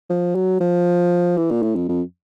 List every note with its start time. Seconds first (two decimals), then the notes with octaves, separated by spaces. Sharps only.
0.10 F3
0.35 F#3
0.61 F3
1.37 E3
1.51 A#2
1.63 A2
1.76 F2
1.89 F2